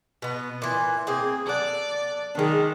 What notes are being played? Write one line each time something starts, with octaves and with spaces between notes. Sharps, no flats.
B2 B3
A#2 E3
A#3 C4 G#4
A4 D5 F#5
D#3 G#3 D4